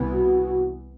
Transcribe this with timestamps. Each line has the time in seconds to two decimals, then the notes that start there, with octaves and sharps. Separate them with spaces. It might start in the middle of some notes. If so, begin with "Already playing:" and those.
Already playing: C2 C3 E3 B3
0.13 F#4